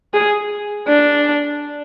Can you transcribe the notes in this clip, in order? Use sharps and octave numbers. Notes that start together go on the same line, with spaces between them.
G#4
D4